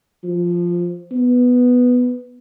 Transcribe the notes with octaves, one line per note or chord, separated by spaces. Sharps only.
F3
B3